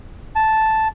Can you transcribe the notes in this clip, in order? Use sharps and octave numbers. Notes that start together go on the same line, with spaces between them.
A5